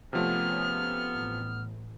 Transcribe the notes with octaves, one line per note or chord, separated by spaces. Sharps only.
C3 F3 A3 B3 C#4 G#4 F6
A1